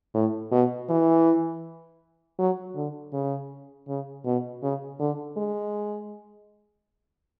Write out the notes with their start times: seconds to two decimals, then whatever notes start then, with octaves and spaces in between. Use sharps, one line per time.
0.14 A2
0.52 B2
0.89 E3
2.39 F#3
2.76 D3
3.13 C#3
3.88 C#3
4.25 B2
4.62 C#3
5.00 D3
5.37 G#3